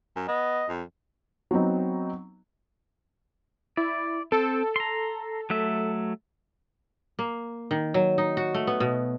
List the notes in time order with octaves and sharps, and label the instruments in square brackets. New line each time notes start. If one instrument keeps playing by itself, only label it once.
[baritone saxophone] F#2
[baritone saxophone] B3 [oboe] D#5
[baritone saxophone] F2
[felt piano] F#3 B3 C4 D#4
[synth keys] E4 [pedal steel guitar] D5
[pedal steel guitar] C4 [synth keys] A4
[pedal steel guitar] A#5 C6
F#3 A3 E5
[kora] A#3
D#3
F#3
D#4
F#4
A3
B3
B2